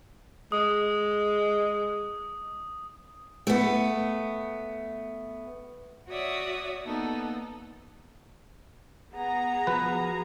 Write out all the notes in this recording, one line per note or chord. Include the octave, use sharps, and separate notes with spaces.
G#3 D#6
A3 B3
F#4 C#5 D5 E5 D#6
A#3 B3 D#4 A4
B3 G#4 F#5 A#5
F3 F#4 B4